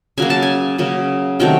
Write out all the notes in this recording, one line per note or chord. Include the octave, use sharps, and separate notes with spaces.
C#3 F#3 A#3 G#5
A5
G#5
C#3 F#3 A#3
C3 D#3 F#3 A3 G5